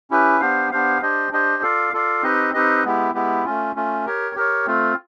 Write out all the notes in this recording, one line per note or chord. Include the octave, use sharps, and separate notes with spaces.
C#4 E4 G4 B4
B3 D4 G4 C5 F5
B3 D4 G4 C5 F5
D4 G4 C5 D#5
D4 G4 C5 D#5
F4 A4 D5 F5
F4 A4 D5 F5
C4 D#4 G4 B4 D#5
C4 D#4 G4 B4 D#5
G#3 B3 E4 G4
G#3 B3 E4 G4
A3 C#4 F4
A3 C#4 F4
G4 A#4 C#5
G4 A#4 C#5
A3 C4 F4